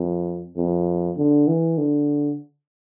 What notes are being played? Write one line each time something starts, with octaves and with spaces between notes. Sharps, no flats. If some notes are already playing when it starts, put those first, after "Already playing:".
Already playing: F2
F2
D3
E3
D3